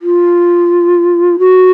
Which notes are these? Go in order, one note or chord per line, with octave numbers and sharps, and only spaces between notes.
F4
F#4